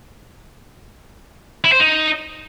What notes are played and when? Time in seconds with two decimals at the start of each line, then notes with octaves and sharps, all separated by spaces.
1.64 E4
1.72 C5
1.80 D#4